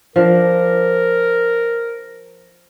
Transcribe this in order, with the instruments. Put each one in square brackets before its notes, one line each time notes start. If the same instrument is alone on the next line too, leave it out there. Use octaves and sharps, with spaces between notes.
[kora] F3 D4 [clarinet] A#4